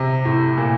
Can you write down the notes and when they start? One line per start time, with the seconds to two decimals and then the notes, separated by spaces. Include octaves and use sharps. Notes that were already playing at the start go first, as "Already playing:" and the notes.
Already playing: C3
0.25 A2
0.57 A#2